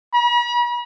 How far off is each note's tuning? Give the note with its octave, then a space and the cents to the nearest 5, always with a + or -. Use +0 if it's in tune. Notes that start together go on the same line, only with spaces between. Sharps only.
B5 -45